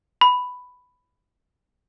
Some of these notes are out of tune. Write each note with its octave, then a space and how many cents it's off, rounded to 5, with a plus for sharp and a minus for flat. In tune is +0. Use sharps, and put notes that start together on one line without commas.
B5 +5